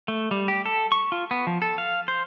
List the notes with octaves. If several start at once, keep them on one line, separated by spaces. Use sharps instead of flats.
A3
G3
G4
A4
C#6
F4
B3
F3
A4
F5
C5